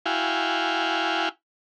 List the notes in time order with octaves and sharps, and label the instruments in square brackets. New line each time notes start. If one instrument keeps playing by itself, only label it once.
[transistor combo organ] E4 F#4 F5 G5 G#5